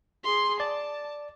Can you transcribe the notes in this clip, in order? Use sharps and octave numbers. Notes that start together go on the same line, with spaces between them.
G#4 C6
D5 A5